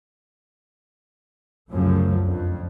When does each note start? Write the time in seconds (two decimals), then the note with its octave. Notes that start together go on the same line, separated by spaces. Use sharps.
1.70 C2 F#2 C#3 F3 F#3 A3
2.21 F2 D3